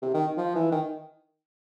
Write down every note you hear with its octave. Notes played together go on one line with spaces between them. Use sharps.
C3
D#3
F3
E3
D#3